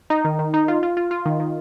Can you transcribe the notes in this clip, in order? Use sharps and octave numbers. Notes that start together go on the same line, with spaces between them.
D#4
D#3
D#3
D#4
F4
F4
F4
F4
D#3
D#3